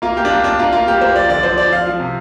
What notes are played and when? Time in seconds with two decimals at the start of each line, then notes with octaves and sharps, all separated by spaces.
0.02 A#3 F4
0.17 A#3 G4
0.25 D4
0.30 A#3 F4
0.44 A#3 D4
0.59 A#3 F4
0.73 A#3 F4
0.87 A#3 G4
1.01 A#3 C5
1.15 F3 D5
1.29 D3 D5
1.43 F3 C5
1.58 F3 D5
1.71 C4 F5
1.86 F3
2.00 C3